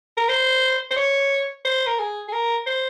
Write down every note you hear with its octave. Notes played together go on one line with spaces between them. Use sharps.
A#4
C5
C5
C#5
C5
A#4
G#4
G#4
A#4
C5